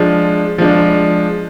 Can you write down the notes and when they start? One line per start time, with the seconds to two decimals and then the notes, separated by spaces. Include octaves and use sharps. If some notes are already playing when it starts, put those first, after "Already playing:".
Already playing: F3 G#3 D4
0.58 F3 G#3 D4